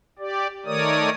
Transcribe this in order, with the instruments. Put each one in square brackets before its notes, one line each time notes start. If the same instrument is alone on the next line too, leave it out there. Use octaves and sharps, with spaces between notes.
[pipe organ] G4 D5
D#3 A3 A#4 C#5 D5 D#6